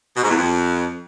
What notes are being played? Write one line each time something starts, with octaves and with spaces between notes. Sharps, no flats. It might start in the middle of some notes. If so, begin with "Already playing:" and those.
B2
G#2
E2
F2